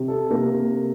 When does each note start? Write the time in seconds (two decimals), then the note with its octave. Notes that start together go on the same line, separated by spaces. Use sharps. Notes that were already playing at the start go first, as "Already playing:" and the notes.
Already playing: C3
0.08 A4
0.30 C3 A#3 A#4